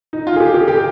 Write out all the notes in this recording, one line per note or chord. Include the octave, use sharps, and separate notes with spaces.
D#4
F4
G#4
G4
G4
G4